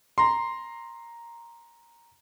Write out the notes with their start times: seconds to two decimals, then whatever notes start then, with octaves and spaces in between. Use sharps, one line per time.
0.18 A#5 C6